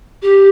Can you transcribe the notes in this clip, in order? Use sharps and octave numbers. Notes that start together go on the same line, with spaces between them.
G4